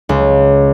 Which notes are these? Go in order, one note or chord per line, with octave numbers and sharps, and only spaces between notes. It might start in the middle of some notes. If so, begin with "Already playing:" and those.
C#2